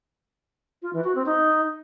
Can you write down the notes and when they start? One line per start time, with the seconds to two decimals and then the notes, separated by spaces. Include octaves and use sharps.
0.82 F4
0.93 E3
1.04 F#4
1.15 C4
1.26 D#4